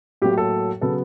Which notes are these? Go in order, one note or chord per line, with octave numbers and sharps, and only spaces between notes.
A2 F#3 A#3 G4
A4
C#3 F#3 B3 A4